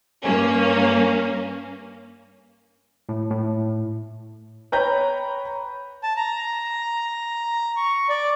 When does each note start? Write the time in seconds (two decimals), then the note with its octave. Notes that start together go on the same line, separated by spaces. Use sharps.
0.23 G2 A#3 C#4
3.09 A2
3.31 A2
4.72 B4 C#5 G5 A#5 B5 G6
6.03 A5
6.17 A#5
7.77 C#6
8.09 D5